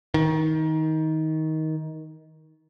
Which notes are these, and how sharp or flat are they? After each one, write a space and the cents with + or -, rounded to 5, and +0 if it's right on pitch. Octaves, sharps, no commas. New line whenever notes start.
D#3 +20